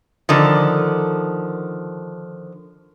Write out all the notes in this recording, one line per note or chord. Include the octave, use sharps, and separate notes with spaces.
D3 D#3 F3